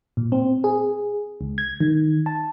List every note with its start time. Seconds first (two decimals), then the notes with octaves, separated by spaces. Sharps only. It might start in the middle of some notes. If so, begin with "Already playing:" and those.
0.17 A#2
0.32 C4
0.64 G#4
1.41 C#2
1.58 G#6
1.80 D#3
2.26 A5